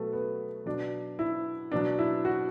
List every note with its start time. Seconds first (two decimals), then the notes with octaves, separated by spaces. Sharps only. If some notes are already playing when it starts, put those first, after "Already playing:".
Already playing: B2 F#3 A3 B3
0.13 B3
0.66 B2 F#3 D4
1.19 E4
1.72 B2 F#3 D4
1.99 E4
2.25 F#4